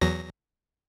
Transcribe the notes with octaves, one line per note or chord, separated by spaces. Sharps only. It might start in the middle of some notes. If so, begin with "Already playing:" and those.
E2 F#3 A#6